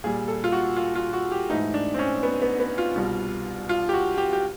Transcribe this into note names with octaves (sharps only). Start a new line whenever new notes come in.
A#2 G3 G#4
A4
F4
F#4
F4
F4
F#4
G4
G#2 E3 A3 D#4
D4
C4
C#4
B3
B3
B3
F4
C2 B2 G3
F4
G4
F#4
G4
G4